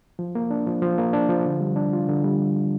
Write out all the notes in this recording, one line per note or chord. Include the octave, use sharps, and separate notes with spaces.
F3
A#3
D4
F3
F3
A#3
D4
F3
D3
G3
D4
F4
D3
G3